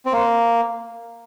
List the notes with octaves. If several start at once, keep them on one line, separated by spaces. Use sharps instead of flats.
C4
A#3